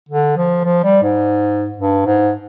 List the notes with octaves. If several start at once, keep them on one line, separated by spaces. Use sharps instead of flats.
D3
F3
F3
G3
G#2
G2
G#2